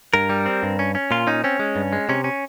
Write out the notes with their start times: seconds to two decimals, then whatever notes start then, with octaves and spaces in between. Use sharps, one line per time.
0.14 G2 A#4
0.30 G3
0.46 C4
0.63 G2
0.79 C#4
0.95 C#4
1.11 A#2 F4
1.27 C#4 D#4
1.44 C4 C#4
1.59 G#3
1.76 G2
1.93 G#3
2.09 C3 C#4
2.24 C#4